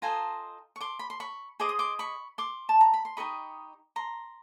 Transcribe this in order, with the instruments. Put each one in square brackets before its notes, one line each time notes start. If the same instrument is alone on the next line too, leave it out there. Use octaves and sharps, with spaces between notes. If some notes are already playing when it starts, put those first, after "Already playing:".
[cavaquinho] F4 A4 C5 D#5 G#5 A#5
C#6
C6 D6
B5
C6
B5 C#6
G#4 C5 D#5 D6
D#6
C6 D6
B5 C#6
C6 D6
A5
A#5
B5
C6
D#4 G4 A#4 D#5 B5 C#6
A#5 C6